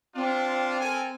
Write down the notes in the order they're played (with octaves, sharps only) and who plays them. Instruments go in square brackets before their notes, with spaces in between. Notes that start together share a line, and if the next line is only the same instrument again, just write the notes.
[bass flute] C4 [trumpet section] D4 F4
[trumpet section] A4 A#4 G#5